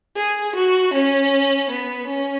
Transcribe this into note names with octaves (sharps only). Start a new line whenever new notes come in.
G#4
F#4
C#4
B3
C#4